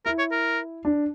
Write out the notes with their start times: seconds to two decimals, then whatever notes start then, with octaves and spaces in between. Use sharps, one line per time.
0.06 E4 A#4
0.19 C#5
0.32 A#4
0.85 D4